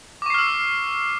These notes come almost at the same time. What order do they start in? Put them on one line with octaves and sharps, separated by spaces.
D6 C#6 C7 F6 E6